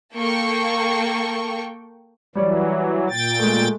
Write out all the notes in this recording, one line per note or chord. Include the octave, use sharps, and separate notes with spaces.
A#3 A4 G5 C#6
E3 F#3 G3 C#5 D5
A#2 G5 A6
G#3 A3